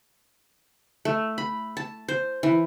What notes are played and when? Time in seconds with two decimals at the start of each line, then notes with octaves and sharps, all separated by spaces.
1.05 A3
1.38 B5
1.77 A5
2.08 C5
2.43 E3